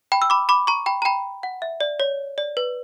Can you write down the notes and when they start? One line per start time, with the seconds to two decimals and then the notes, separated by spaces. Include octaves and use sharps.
0.12 G5 B5
0.22 E6
0.30 B5 D6
0.49 B5 D6
0.67 A#5 C#6
0.86 G5 B5
1.02 A#5
1.05 G5 B5
1.43 F#5
1.62 E5
1.81 D5
2.00 C#5
2.38 D5
2.57 B4